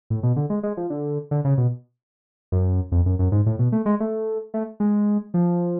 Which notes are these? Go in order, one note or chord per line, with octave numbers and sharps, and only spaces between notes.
A2
B2
D3
G#3
G#3
F3
D3
D3
C#3
B2
F#2
F2
F#2
F#2
G#2
A2
B2
A3
G#3
A3
A3
G#3
F3